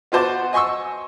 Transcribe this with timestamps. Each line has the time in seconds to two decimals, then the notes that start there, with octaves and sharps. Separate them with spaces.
0.12 B3 F4 F#4 C5 A5 D6
0.53 D#5 G#5 C6 C#6 E6